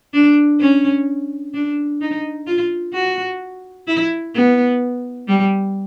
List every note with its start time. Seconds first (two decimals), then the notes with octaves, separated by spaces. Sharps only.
0.13 D4
0.60 C#4
1.54 D4
2.01 D#4
2.47 F4
2.94 F#4
3.87 E4
4.35 B3
5.28 G3